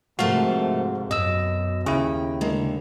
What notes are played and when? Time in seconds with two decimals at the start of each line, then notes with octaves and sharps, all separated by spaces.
0.19 G#2 C3 F3 A3 F#4 A#4 F5
1.11 F#2 B2 D#5 E6
1.86 D#2 C#3 E4 G5
2.41 D3 G#3 A#3